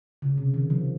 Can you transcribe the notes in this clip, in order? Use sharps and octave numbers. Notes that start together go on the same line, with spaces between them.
C#3
C3
D#3
F3